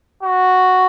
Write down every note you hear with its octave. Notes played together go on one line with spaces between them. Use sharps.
F#4